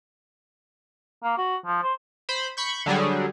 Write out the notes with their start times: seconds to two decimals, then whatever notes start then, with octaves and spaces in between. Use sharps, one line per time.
1.24 A#3
1.38 F#4
1.66 F3
1.83 C5
2.29 C5 B5
2.57 B5 C#6 G6
2.86 D3 F#3 G3 G#4